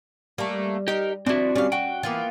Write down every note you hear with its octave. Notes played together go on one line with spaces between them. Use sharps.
G3 A3 A#3
D#4 G4 A#4
F3 C4 D4 E4 F#4
G3 C#4 F5
F#4 G5
E3 A#3 B3 F4